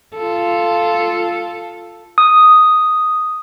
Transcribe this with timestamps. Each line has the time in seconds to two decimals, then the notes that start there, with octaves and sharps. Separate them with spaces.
0.16 F4 A4
2.18 D#6